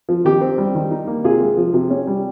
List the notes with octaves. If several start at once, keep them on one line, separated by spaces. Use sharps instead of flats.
F3
D#3 G4
C4
G3
D#3
D#4
A#3
C3 F4 G#4
G#3
F3
C3
C#4
G3